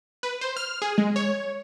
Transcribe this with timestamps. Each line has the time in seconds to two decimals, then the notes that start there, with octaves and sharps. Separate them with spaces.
0.23 B4
0.41 C5
0.57 F6
0.82 G#4
0.98 G#3
1.16 C#5